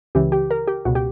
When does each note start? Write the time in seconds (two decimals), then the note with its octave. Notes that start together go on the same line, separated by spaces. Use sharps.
0.15 C#2 C#3 E3 G4
0.32 G4
0.51 A#4
0.68 G4
0.85 C#2 B2 F#4
0.95 G4